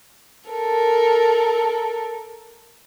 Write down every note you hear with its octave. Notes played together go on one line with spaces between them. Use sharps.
A4 A#4